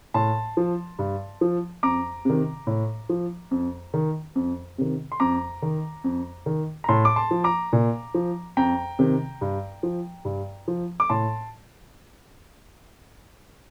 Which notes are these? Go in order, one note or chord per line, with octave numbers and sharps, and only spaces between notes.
A2 A5 C6
F3
G2
F3
F2 A#5 D6
C3 D#3
A2
F3
F2
D#3
F2
C3 D#3
C6
F2 A#5 D6
D#3
F2
D#3
A#5
A2 A5 C6
D6
A5 C6
F3
A#5 D6
A#2
F3
F2 G5 A#5
C3 D#3
G2
F3
G2
F3
D6
A2 A5 C6